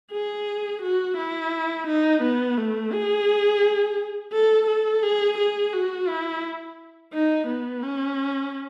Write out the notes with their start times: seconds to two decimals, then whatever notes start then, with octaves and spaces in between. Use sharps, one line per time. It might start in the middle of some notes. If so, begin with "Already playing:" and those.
0.12 G#4
0.82 F#4
1.17 E4
1.87 D#4
2.22 B3
2.57 A3
2.93 G#4
4.33 A4
4.67 A4
5.03 G#4
5.38 G#4
5.73 F#4
6.08 E4
7.13 D#4
7.47 B3
7.83 C#4